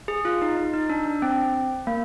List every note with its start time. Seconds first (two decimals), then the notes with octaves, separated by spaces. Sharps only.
0.08 G#4
0.25 F4
0.42 D#4
0.57 D#4
0.74 D#4
0.90 D4
1.06 D4
1.22 C4
1.87 A#3